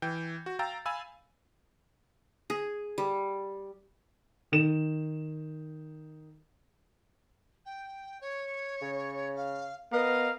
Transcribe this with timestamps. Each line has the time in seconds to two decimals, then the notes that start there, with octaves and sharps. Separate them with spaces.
0.02 E3 G5 G6
0.46 F#4
0.59 F5 G5 A#5 E6 A6
0.86 F5 G#5 B5 E6
2.50 G#4
2.98 G3
4.52 D#3 E7
7.65 G5
8.20 C#5
8.82 C#3
9.35 F5
9.92 B3 A#4 D#5 F5